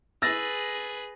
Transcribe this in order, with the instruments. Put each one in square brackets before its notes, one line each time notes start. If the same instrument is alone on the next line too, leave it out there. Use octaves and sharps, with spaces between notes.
[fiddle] G#4 B4 [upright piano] E6 A6 A#6